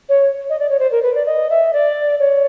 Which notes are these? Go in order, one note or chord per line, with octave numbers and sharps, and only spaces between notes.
C#5
D#5
D5
C#5
C5
A#4
B4
D5
D#5
E5
D5
C#5